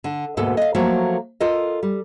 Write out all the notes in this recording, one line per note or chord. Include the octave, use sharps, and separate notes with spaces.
D3
D2 G#2 B2 A#3 A4
D#5 F5
F3 F#3 A3 A#3
F4 A4 A#4 D#5
G3